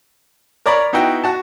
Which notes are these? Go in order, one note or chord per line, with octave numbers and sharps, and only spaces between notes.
A#4 C#5 D5 A#5 B5
B3 D#4 E4 F#4 G5
F#4 A5